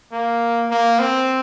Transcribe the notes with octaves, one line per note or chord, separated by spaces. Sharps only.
A#3
A#3
C4